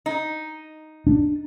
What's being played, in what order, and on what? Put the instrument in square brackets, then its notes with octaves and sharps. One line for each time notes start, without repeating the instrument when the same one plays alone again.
[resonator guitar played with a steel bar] D#4
[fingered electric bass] D4